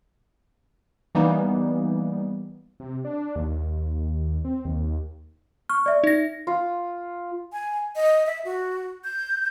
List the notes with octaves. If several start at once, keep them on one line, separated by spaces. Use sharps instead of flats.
E3 G3 A#3 B3 D#4
C3
D4
D#2
C4
D#2
C#6 F6
D5 E5
D#4 A#6
F4
G#5
D#5
E5
F#4
G6